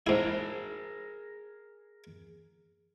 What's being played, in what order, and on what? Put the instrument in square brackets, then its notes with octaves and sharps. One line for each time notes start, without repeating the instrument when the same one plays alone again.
[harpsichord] G#2 E4 [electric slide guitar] G#4 A#4 A#5